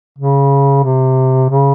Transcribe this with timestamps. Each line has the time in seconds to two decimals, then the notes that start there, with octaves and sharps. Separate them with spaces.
0.18 C#3
0.84 C3
1.50 C#3